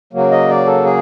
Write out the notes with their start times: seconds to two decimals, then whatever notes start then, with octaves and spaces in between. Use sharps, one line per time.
0.13 C#3 F#3 A#3
0.31 D#5
0.49 D5
0.66 A4
0.85 G#4